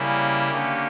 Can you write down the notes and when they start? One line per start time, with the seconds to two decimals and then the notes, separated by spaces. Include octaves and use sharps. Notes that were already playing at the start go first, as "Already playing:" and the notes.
Already playing: C#3 G3 A#3 C#4 E4
0.51 D3 A#3 C#4 G4